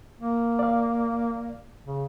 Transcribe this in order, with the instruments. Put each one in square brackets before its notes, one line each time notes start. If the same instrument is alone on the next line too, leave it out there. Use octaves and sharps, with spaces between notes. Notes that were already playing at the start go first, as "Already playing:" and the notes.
[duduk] A#3
[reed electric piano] D5 F5
[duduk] C#3